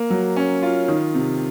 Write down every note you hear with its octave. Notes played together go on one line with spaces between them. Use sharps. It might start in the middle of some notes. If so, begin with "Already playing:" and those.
Already playing: A#3
F#3
C#4
F4
D#3
C3